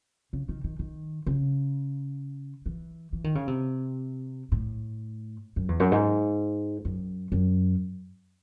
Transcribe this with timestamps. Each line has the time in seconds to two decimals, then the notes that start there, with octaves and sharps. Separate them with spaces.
0.33 C#3
0.49 D#3
0.64 D#3
0.79 D#3
1.27 C#3
2.66 E3
3.13 E3
3.24 D#3
3.35 C#3
3.48 C3
4.52 A2
5.56 F#2
5.69 E2
5.80 F#2
5.92 G#2
6.85 F#2
7.32 F#2